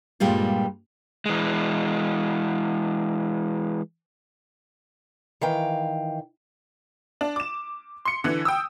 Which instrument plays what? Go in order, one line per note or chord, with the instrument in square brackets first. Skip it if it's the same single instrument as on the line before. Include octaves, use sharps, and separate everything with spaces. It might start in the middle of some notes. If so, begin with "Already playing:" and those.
[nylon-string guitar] G2 A#2 G3 G#3 F4
[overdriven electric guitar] E3 G#3
[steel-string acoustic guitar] D#3 E3 F5 G5
[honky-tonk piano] D4
D6 E7
C6 C#7
D3 E3
G5 D#6 E6